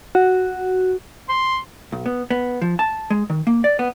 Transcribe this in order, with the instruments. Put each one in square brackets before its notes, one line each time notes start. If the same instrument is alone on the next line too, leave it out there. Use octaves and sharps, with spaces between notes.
[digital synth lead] F#4
[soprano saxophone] C6
[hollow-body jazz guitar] B1
B3
B3
F3
A5
G#3
D#3
A#3
D5
B3